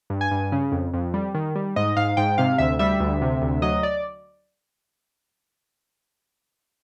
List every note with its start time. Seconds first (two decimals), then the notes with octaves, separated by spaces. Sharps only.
0.10 G2
0.21 G#5
0.31 G2
0.52 C#3
0.72 F2
0.93 F2
1.14 G3
1.34 D#3
1.55 G3
1.76 G#2 D#5
1.97 G#2 F5
2.17 G#2 G5
2.38 C3 F5
2.58 D2 E5
2.79 G3 E5
3.00 D2
3.22 C3
3.42 D2
3.62 F#3 D#5
3.83 D5